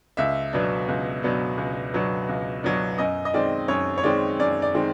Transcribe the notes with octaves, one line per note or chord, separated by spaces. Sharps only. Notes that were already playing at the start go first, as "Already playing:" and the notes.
C#2 E5
B2 F#3 B3 D4
C#2
B2 F#3 B3 D4
C#2
B2 F#3 B3 D4
C#2
B2 F#3 B3 D4
F#2 D#5
D#5
D#3 G#3 C4 D5
F#2 C#5
C#5
D#3 G#3 C4 D5
F#2 D5
D5
D#3 G#3 C4